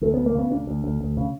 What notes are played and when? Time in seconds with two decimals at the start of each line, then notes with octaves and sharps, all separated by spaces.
0.02 D2 A3
0.14 D2 B3
0.26 A#3
0.35 C#3 B3
0.51 D2 D4
0.67 D2
0.84 D2
1.01 D2
1.17 C#3